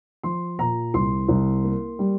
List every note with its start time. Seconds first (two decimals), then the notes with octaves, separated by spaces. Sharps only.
0.23 F3 C6
0.59 A#2 A#5
0.94 C2 C6
1.28 C2
1.64 A#3
1.99 G3